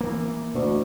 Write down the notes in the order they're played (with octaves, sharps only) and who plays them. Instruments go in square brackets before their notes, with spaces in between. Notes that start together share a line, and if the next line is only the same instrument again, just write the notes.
[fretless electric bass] E3 A#3
[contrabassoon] D2 [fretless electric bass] B2